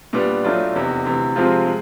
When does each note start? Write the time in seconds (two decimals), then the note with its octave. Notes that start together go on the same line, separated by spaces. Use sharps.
0.13 A#2 G3 B3 D4
0.44 A2 F#3 A3 D4 F4
0.74 F1 E2 C3
1.05 D2 C3 E3
1.36 C3 F3 G#3 C4 F4
1.66 G#3